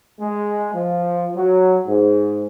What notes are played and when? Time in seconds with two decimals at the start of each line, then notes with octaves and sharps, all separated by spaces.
0.21 G#3
0.73 F3
1.35 F#3
1.87 G#2